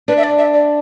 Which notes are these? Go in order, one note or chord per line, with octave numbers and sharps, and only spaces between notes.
D4 B4
E5
D5
E5
D5